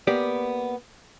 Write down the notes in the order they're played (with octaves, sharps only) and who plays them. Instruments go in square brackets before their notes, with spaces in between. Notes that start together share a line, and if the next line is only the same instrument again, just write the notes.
[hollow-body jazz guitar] A#3 B3 G4 D5